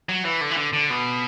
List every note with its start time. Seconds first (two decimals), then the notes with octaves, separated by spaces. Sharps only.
0.09 F#3
0.25 E3
0.41 D3
0.51 E3
0.57 D3
0.73 D3
0.90 B2